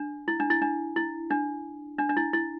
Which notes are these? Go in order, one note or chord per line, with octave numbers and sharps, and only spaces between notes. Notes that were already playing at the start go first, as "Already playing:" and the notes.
Already playing: D4
E4
D4
E4
D4
E4
D4
D4
D4
E4
E4